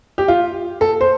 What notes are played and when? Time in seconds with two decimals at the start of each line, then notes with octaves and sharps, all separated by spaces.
0.18 G4
0.28 F4
0.81 A4
1.01 C5